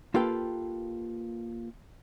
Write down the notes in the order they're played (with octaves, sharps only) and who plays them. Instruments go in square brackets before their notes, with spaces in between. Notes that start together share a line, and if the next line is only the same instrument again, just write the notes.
[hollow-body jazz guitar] A#3 F4 G4 A4 B4 G5